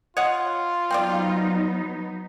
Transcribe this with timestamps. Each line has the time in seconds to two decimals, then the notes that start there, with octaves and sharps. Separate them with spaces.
0.17 F4 C#5 D#5 F#5
0.91 F#3 B3 C4 D#4 C5 D5